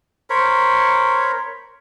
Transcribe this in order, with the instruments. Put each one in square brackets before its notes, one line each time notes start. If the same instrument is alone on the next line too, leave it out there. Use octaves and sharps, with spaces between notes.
[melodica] A#4 C5 C#5 B5